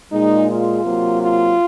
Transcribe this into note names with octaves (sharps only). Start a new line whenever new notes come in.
A#2 G#3 D#4
F4
C3 F#3 A#3
F4